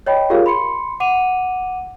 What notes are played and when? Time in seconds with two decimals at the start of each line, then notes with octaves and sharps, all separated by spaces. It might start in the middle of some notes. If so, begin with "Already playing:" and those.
0.06 C#5 D#5 G5 B5
0.30 F4 G4 G#4 A#4 C#5 F5
0.46 B5 C6 C#7
1.00 F#5 D6 D#7 F7